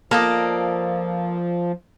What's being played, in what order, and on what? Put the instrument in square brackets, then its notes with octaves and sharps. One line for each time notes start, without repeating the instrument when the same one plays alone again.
[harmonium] F3 [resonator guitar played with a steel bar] A#3 [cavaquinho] A4 D5 D#5